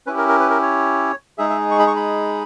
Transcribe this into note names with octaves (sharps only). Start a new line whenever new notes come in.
C#4 E4 G4 B4
A#4
A#4
B4
A#4
C#5
G#3 D#4 G#4 E5
E5
C#6
B5
C#6
B5